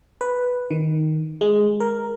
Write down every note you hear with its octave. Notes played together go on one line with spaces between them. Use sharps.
B4
D#3
G#3
A#4